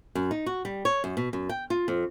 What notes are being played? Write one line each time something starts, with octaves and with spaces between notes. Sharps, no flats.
F#2
D#4
F#4
G3
C#5
F#2
B2
F#2
G5
F4
F2